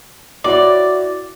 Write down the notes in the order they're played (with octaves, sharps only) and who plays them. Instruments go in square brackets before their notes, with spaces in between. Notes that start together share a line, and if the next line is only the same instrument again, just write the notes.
[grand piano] E4 F#4 C#5 [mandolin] D5